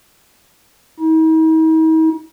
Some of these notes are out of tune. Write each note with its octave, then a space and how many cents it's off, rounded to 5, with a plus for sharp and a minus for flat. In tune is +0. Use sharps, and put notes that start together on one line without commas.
D#4 +45